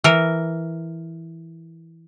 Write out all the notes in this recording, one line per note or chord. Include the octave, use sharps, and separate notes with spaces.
E3 A#4